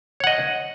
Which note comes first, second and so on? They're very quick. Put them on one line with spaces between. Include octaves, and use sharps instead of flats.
C#5 F#5 D#5